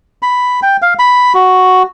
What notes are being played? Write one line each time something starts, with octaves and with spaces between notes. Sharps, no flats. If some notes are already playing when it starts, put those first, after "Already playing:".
B5
G5
F5
B5
F#4